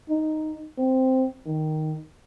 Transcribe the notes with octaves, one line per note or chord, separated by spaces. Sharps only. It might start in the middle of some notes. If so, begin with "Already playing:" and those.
D#4
C4
D#3